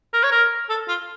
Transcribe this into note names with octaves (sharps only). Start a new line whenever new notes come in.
A#4
C#5
A#4
A4
F4